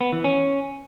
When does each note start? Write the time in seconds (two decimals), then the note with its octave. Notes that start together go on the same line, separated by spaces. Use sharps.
0.01 B3
0.12 E3
0.24 C#4